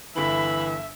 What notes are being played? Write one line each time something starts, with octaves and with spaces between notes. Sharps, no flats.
G1 E3 E5 B5 F#7